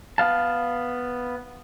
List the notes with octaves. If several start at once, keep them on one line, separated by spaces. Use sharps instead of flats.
B3 F5 A5